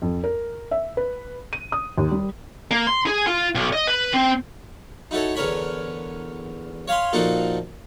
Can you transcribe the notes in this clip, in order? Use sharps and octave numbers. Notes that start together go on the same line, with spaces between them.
F2
A#4
E5
B4
D#7
D#6
D#2
G3
A#3
C6
G#4
F4
B1
D#5
B4
C4
D#4 E4 F#4 A4 C#5
E2 D3 A#4 C#5 G#5 B5
C#5 F5 G#5 B5 C6
A#2 F3 A#3 D#4 F#4 A4